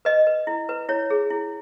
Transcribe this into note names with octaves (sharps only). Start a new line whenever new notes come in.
B4 D#5
B4
E4
B4
E4 C#5
G#4
E4